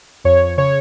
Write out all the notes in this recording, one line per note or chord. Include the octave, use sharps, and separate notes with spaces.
F2 C#5
C#3 C#5